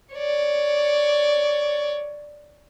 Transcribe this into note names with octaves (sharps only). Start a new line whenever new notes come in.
C#5 D5